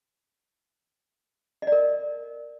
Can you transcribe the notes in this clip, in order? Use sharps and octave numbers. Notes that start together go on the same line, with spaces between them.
A#4 D5 D#5